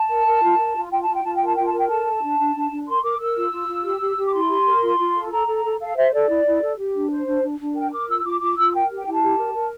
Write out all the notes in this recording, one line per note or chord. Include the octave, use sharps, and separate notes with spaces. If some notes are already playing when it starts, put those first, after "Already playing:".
Already playing: A5
A#4
A#4
F4
A#4
F4
F4 G5
A5
F4
G5
F4 A5
G5
A#4 A5
F4 G5
A5
A#4
G5
A4 A5
A4
D4
D4
D4
D4
A#4 C6
A#4 D6
A#4 E6
F4
F4
F4
G4
G4
G4
D6
E4 C6
G4
A#4
F4
F4
A4
A4 A#5
A4
A4
A4 F5
C5 E5
A4 D5
E4
E4
A4
G4
D4
C5
D4
D4
D4
A#4 G5
A#4 D6
F4 E6
F4 D6
F4 D6
F4 E6
A#4 G5
G4
G5
E4 A5
G4
A#4
A#4